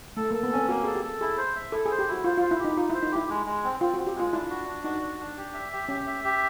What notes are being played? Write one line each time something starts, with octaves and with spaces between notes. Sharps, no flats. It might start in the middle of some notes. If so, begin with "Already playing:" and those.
A3 A4
A#3 A4
B3
C4 C#4
A#3 F#4
G#4 A4
G4
A4
E4 G#4
C5
E5
E4 A4
G#4
C5
G4
E4 F#4
F4 C5
F4
C5
E4
G4
D#4
D#4 F4
E4 C5
D#4
E4 G4
G#3
G#3
C4
C4 F4
F#4
C4
G4
G#3 F4
D4 E4
F#4
D4
D#4 F#4
D4
D4
G4
E5
G4
C#4 G4
E5
G4